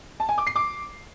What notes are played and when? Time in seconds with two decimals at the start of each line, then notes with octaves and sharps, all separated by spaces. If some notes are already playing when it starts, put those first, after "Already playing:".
0.20 A5
0.29 G#5
0.38 D6
0.47 C7
0.56 D6